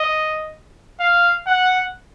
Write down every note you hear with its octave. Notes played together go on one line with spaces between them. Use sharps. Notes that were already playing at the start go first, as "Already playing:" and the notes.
Already playing: D#5
F5
F#5